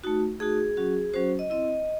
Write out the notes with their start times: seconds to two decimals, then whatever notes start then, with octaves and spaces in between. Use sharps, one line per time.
0.04 A3 D#4 F#4
0.40 A3 D#4 F#4 G#4
0.77 F#3 C#4 F#4
1.13 F#3 C#4 F#4 C5
1.39 D#5
1.50 C4 E4 D#5